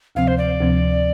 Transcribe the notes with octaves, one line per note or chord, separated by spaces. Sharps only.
D2 C3 F3 C4 F5
C5
D5
D2 C3 F3 C4